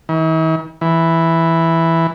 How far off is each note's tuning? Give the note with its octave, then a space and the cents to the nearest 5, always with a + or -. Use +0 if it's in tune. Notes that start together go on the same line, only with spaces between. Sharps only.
E3 -45
E3 +0